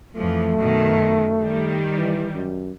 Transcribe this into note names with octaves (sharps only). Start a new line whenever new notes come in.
F2 E3 F3 A3
F#2 B2 D#3
D#3 G3
E3
F#2